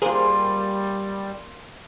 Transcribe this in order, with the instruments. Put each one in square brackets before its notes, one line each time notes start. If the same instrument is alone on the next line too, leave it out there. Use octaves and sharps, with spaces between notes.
[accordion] G3 [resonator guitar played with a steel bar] A#3 F4 [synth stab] G#4 A#4 C5